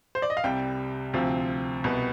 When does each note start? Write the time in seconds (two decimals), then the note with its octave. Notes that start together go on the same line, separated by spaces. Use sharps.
0.15 C5
0.22 D5
0.30 D#5
0.37 F5
0.44 C2 C3 G3 G5
1.13 D2 C3 F3 C4
1.84 C2 B2 B3